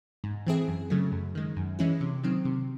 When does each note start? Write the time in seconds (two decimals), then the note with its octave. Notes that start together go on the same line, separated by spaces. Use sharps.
0.24 G#2
0.47 E3 C4 E4 G#4
0.68 F#2
0.90 C#3 F#3 A3
1.12 F#2
1.35 D#3 G#3
1.56 F#2
1.79 E3 G#3 C#4 E4
2.01 C3
2.23 D#3 F#3 C4
2.45 C3